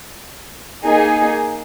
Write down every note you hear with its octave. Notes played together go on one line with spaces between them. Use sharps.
A#3 D#4 G#4